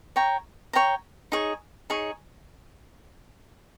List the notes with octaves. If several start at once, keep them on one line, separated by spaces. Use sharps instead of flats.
C#5 G5 A#5
C#5 G5 A#5
D#4 G#4 C#5
D#4 G#4 C#5